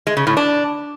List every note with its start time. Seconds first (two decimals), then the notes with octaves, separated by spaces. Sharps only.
0.07 G#3
0.17 C#3
0.27 A2
0.37 D4